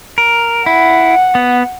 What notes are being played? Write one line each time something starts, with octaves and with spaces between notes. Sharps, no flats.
A#4
E4 F#5
B3